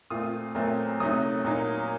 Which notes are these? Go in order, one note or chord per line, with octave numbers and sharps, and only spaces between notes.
A#2 A3 C4 F4 D#6
A#2 F#3 A3 C4
C3 F#3 A3 D#4 D#6
A#2 F#3 A#3 D#4